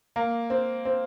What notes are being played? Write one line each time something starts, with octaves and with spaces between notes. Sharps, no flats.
A#3
C4
C4